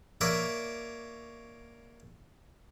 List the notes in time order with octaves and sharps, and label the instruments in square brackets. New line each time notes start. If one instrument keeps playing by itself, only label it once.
[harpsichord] A#3 A#4 C#5 D5 E5